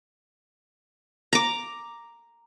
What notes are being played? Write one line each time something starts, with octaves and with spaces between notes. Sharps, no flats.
A#5 D6